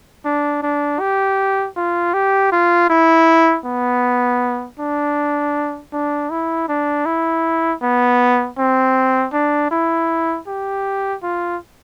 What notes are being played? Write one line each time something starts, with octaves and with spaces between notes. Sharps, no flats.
D4
D4
G4
F4
G4
F4
E4
B3
D4
D4
E4
D4
E4
B3
C4
D4
E4
G4
F4